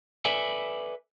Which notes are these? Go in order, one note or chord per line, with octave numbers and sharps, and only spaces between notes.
A4 B4 D5 E5 G#5